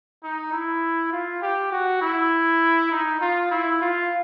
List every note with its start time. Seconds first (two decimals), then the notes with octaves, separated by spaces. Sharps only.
0.23 D#4
0.53 E4
1.13 F4
1.42 G4
1.72 F#4
2.02 E4
2.92 D#4
3.21 F4
3.51 E4
3.82 F4